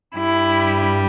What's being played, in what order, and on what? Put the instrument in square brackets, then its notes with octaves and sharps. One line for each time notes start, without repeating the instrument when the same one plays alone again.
[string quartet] G2 G3 E4